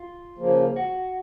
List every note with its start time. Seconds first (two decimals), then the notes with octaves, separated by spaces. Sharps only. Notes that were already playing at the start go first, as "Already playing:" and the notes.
Already playing: F4
0.38 C#3 F3 A#3
0.76 F#4